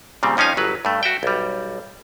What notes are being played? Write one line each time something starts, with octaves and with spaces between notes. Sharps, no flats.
A#2 C#3 G3 C4
F2 F3 C#4 D#4 F5 G#5
G1 F#3 B4
G2 A3
F#4 E5 G5
B1 G3